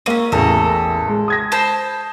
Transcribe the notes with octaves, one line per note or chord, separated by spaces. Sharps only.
A#3 C4 C#4 D#7
A1 E2 A4 A#4
G#3
D#6 G#6 A#6
C5 A5 B5